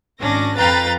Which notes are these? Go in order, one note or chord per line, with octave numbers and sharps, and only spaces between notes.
G#1 C#4 D4 A#6
F2 B4 F5 G5 A#5 A6